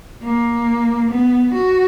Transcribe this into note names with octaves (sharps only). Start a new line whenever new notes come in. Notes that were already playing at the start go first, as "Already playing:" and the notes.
A#3
B3
F#4